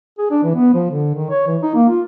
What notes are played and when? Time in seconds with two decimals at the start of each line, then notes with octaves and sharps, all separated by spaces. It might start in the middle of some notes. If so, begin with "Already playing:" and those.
0.19 G#4
0.31 D4
0.43 E3
0.55 B3
0.74 F3
0.90 D3
1.15 D#3
1.30 C#5
1.47 E3
1.62 D#4
1.75 A#3
1.89 F4